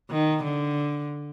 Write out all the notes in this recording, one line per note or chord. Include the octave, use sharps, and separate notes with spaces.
D#3
D3